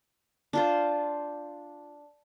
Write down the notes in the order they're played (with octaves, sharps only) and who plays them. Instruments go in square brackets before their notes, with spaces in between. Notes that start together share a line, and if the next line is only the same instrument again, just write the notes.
[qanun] D4 F4 C5